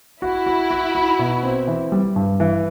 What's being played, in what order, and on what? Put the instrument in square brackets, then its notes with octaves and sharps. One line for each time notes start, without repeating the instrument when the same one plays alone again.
[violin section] E4 [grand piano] F#4
[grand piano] F#4
F#4
F#4
B2
C4
E3
G3
G2
E3